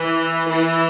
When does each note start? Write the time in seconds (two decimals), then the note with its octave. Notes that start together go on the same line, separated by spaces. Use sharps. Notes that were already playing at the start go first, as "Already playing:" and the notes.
Already playing: E3
0.49 E3